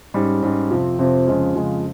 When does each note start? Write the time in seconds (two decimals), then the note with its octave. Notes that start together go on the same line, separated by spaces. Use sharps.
0.14 G#2 G3 C#4
0.42 G#2 G3 C#4
0.70 F2 C3 F3 C4
0.99 F2 C3 F3 C4
1.27 F2 C#3 F3 G#3 C#4
1.55 F2 C#3 F3 G#3 C#4